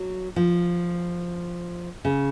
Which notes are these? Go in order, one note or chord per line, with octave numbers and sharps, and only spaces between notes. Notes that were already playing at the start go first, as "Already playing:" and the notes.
Already playing: F#3
F3
C#3